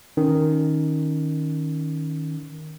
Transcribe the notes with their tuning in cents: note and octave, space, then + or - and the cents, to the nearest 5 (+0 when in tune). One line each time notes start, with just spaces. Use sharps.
D#3 +0 C#4 +0